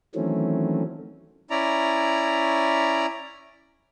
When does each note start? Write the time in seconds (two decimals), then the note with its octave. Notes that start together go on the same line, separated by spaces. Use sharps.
0.15 D#3 E3 F#3 A3 C4 C#4
1.50 C#4 E4 D5 A#5